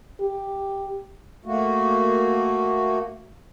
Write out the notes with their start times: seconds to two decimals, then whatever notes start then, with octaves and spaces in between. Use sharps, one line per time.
0.20 G4
1.45 A3 A#3 F#4